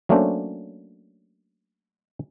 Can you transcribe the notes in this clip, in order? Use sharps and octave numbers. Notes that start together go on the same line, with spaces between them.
F#3 A3 A#3 C#4 D4 C5